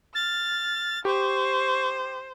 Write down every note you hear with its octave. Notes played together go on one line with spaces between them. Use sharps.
F6 A6
G4 C5 C#6